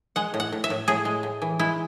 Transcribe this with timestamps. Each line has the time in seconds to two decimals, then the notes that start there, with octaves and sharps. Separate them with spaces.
0.16 G#3 F#5
0.34 A2
0.40 F#5
0.52 A2
0.64 E5
0.70 A2
0.88 A2 G#4
1.05 G#3
1.23 A2
1.42 E3
1.59 G#3 E4